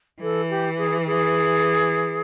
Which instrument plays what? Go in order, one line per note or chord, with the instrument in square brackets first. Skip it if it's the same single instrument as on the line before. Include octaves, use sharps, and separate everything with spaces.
[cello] E3 [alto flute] A4
[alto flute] G4
G#4
G#4